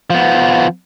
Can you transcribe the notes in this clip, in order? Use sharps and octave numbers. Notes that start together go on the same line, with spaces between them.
F3 B3